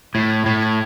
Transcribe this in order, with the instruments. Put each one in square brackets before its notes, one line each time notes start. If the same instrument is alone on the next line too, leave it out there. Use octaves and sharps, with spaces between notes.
[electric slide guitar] A2 [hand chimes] G#6
[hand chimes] G#6
[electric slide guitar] A2 [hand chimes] G#6
[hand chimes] G#6